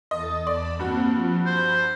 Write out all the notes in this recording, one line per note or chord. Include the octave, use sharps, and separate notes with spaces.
E2 A4 D#5 A6
E2 D5 A5 B5
G2 A#3 C4 F#4
F3
C5 B5